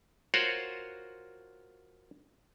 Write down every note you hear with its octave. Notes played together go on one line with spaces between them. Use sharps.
F4 F#4 A#4 C5 C#5 F#5